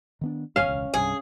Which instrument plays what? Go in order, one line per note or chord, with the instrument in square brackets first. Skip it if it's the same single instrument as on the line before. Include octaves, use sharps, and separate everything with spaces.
[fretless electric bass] D#3 B3 D4
[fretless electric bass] F#1 E2 [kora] C#4 F5
[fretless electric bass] E1 C#2
[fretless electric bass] C2 G2 [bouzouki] G#4